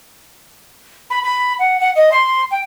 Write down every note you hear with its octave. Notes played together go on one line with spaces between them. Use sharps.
B5
B5
F#5
F#5
D#5
C6
G5